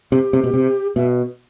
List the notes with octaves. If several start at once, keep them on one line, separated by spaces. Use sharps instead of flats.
C3 G4
C3
B2
C3
B2 E5